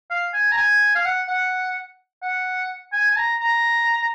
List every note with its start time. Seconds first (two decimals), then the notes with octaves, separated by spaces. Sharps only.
0.10 F5
0.34 G#5
0.52 A#5
0.57 G#5
0.95 F5
1.05 F#5
1.28 F#5
2.22 F#5
2.93 G#5
3.10 G#5
3.17 A#5
3.40 A#5